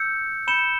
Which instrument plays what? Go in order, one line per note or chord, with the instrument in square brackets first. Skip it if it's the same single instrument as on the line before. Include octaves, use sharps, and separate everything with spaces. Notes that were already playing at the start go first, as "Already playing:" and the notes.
Already playing: [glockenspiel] E6 G6 C#7
B5 G6 C#7 E7 G7